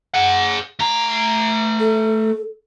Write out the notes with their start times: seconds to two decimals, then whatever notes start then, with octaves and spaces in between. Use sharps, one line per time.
0.14 G#4 F#5
0.79 A3 A#5
1.80 A4